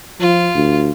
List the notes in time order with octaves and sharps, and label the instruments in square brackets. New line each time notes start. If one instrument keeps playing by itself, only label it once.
[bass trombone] F3 [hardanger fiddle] F4
[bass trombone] D2